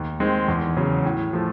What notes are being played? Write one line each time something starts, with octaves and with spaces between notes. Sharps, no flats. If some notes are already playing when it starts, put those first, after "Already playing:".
Already playing: D#2
D#3 G#3 C4
E2
C#3 F#3
A2
F3 A3